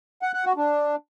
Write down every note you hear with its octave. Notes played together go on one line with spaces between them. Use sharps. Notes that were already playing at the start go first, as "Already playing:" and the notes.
F#5
F#5
F#4
D4